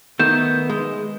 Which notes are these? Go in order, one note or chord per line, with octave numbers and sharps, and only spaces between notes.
D#3 A3 B3 G6 E7
G#3